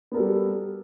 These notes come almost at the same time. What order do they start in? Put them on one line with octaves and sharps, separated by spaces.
B3 A#4 A4 G3